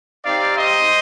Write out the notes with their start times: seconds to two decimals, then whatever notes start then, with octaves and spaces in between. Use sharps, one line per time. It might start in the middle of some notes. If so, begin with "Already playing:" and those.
0.25 C4 D#4 G4 D5 F5
0.57 C5 D#5